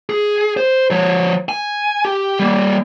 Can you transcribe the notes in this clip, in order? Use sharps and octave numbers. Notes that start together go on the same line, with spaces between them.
G#4
C5
F3 C#5
G#5
G4
G3 A#3